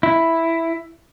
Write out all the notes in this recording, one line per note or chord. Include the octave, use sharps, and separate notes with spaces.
E4